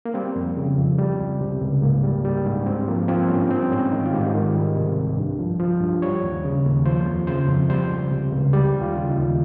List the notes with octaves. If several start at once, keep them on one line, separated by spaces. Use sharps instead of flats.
A#3
G3 C4
F2
C#3
F2
G3
C#2
C3
C#2
G#2 A#3
G3
G3
G#2
G2 C4
F3 A#3
F3 C4
G2 C#4
G3 C4
G#2 C#4
D#3 D#4
F4
G#2 G4
D#3
G3
C3
C2
G2
F3
F3
G2
G3 C#5
D#2
C#3
D#2
F3 C5
F2
C#3 C5
F2
G3 C5
C#2
C3
C#2
G3 G4
D#2
F4
C#3
D#4
D#2